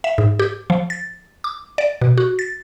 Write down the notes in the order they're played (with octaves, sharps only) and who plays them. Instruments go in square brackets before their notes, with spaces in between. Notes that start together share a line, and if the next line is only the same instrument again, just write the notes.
[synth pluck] E5
G#2
G4
F3
A6
D6
D5
B2
F#4
A6